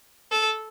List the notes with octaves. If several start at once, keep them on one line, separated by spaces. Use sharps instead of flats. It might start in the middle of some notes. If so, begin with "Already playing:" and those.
A4